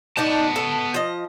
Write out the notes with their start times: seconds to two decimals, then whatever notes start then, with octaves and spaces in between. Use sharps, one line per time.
0.17 B3 D4 D#4 D5 A5
0.56 A4
0.94 F3 D#5